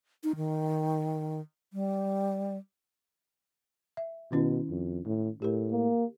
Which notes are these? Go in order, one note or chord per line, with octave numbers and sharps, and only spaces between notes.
D#4
D#3
G3
E5
B2 D#3 C#4 E4
F2
A2
A2 G4 A4 A#4
A#3